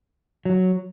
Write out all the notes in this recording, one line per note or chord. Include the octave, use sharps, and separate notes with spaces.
F#3